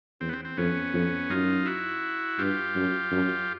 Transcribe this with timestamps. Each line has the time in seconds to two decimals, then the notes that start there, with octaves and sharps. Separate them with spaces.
0.21 E2 C4
0.29 B3
0.33 C4
0.45 C4
0.57 F2 B3 C#4
0.94 F2
1.30 F#2 D#4 F4
1.66 E4 F#4
2.39 G2 F4 G4
2.75 F#2
3.11 F#2